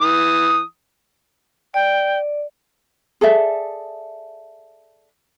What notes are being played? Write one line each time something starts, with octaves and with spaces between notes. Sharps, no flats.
E3 D#6
D5 G5
G#4 A4 D5 E5